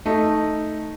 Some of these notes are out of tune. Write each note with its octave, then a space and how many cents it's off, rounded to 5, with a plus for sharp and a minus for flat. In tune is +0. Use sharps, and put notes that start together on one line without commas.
A3 +0 D#4 +0